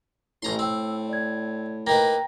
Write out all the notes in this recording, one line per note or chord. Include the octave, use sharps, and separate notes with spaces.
A1 A2 A#5 C6
C4 E6
D5 G#6
A#3 D#4 B4 G5 A#5 A#6